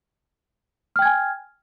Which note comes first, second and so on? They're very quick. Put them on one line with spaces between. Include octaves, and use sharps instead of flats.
F6 G5 G#6 G#5